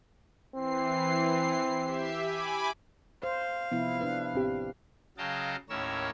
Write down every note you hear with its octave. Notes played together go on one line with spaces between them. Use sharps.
E3 C4 C7
G4 E5
G#5 B5 D6
C5 F5
C3 F3 B3 E4
D4 B4
A1 C4 G4
C#3 F#3 D#5 F5 G5 A5
D#2 A2 C#4 A#4 C#5 E6